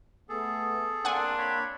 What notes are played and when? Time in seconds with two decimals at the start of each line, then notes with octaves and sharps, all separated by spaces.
0.29 A3 B3 G#4 A4
1.05 A#3 C4 D4 F#5 G#5
1.38 C#5 B5